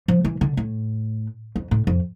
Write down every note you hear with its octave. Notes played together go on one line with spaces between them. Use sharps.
F3
E3
D3
A2
F2
A2
F2